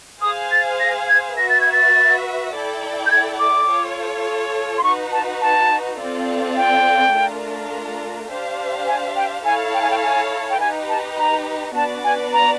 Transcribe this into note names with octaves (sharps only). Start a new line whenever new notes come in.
G#4 C5 F5 G#5 D#6
A6
A#6
G#6
F#4 B4 E5 A#6
A6
G#6
A6
E4 A4 D5 G5
G6
G#6
D6
F4 A4 C#5
C6
D#4 F#4 B4 C#6
A5
A5
C4 F4 A4 D5
G5
A3 D4 F4 A#4
D4 G4 C5 F5
G#5
G5
E4 A4 C#5 F5 G#5 A5
G5
G#5
G5
G#5
G5
D#4 G4 B4 G#5
A5
A#5
B3 D4 F#4 B4 D5 A5
G#5
A#5